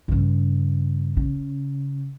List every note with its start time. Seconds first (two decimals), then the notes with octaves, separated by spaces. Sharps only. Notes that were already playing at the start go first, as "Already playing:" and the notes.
0.08 G2 C#3
1.17 C#3